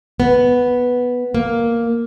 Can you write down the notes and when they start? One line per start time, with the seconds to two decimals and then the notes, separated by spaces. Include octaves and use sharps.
0.20 B3
1.35 A#3